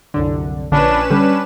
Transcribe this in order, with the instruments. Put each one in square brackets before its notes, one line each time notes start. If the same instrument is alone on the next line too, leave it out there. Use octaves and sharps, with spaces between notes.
[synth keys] C2 F#2 D3
[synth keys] A#1 [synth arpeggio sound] D3 [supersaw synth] C#4 B4 E7 [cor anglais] D4
[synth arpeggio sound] D3 [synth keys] G3 [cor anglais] D4